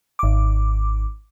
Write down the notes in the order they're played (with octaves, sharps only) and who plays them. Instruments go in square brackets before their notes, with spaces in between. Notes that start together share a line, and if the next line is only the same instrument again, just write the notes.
[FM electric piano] G#1 D6